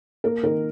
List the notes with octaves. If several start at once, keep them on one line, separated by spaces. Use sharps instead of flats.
A#3 A#4
D#3 A#4